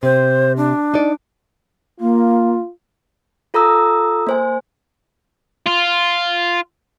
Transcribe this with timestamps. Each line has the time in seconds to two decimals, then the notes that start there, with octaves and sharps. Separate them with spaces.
0.03 C3 C5
0.57 D4
0.94 D#4 D5
2.00 A#3 F4
3.54 F4 A4 A#5 D#6 E6
4.27 A#3 C5 G#5
5.67 F4